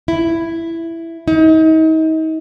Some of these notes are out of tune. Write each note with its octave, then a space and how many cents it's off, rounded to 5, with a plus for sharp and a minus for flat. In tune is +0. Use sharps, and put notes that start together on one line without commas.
E4 +5
D#4 +35